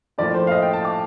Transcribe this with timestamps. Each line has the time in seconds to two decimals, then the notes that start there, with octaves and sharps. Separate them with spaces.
0.18 A2 F3 A#3 D5
0.34 C5
0.47 F5
0.51 D#5
0.62 G5
0.73 A5
0.85 D6